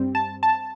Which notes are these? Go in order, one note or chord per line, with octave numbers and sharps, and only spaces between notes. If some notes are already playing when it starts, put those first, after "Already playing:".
Already playing: G2 G3 C4
A5
A5